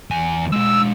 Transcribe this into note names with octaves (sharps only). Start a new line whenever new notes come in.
E2 G#5
G#3 D4 E6